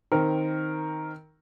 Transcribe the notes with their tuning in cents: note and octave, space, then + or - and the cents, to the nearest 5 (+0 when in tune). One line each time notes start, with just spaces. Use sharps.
D#3 +0 C4 +0 A#4 +0